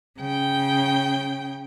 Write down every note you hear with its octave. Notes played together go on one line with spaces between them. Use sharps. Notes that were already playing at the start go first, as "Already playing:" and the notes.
C#3 G5